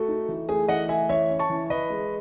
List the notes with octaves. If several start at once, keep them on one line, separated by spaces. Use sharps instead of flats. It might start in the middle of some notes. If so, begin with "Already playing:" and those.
Already playing: A3 F#4 A4
D#4
E3
A3 G#4
E3 D#5 F#5
A3 E5 G#5
E3 C#5 E5
C#4
A5 C#6
E3
E3 B4 D#5
G#3